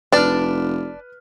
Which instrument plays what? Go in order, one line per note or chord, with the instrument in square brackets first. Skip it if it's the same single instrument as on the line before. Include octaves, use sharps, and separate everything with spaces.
[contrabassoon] F1 [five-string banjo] D4 D5 [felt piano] B4 F6